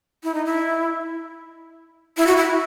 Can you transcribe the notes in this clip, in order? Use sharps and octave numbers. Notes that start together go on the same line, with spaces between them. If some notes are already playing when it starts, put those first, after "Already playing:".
E4
D#4
E4
E4
F#4
E4